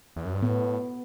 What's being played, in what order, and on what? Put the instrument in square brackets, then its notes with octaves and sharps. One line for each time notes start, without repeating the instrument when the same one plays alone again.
[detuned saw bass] E2
F#2
G2
[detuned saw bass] A2 [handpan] B3